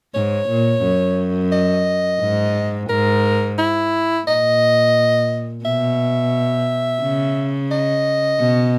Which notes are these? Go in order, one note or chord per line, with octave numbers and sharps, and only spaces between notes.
G#2 C#5
A#2
F#2
D#5
G#2
G#2 A#4
E4
A#2 D#5
B2 E5
C#3
D#5
B2